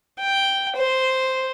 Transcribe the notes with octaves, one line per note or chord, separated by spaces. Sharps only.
G5
C5